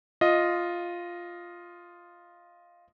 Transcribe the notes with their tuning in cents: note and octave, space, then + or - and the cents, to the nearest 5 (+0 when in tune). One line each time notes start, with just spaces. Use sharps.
F4 +0 D#5 +0